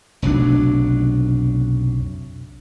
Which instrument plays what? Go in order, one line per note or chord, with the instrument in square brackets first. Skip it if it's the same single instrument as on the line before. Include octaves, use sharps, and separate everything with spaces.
[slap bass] F1 B1 F#3 D4